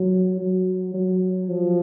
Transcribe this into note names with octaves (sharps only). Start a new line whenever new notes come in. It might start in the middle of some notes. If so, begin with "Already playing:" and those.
Already playing: F#3
F#3
F#3
F3